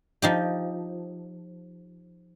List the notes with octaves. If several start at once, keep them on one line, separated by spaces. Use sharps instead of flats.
F3 D#4 G4